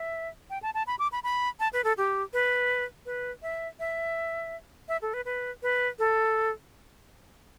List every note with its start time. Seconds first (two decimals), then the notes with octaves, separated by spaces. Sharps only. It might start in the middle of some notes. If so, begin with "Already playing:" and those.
Already playing: E5
0.50 G5
0.63 A5
0.74 A5
0.87 B5
0.99 D6
1.12 B5
1.24 B5
1.60 A5
1.73 B4
1.84 A4
1.97 G4
2.33 B4
3.06 B4
3.42 E5
3.80 E5
4.88 E5
5.02 A4
5.14 B4
5.25 B4
5.63 B4
5.99 A4